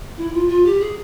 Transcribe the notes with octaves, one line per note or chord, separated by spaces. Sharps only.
E4
F4
F4
G4
G#4